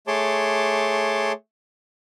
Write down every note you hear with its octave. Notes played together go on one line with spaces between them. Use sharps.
A3 G#4 C#5 A5 C6 D6